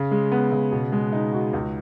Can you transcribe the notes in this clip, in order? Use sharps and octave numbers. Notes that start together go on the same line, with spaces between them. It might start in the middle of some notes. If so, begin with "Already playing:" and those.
Already playing: C#3
G#3
B3
C#3
B2
G#3
D#4
F#4
C#2